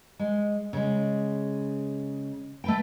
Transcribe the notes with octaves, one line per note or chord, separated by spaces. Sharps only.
G#3
C#3 G#3
A3 B4 G5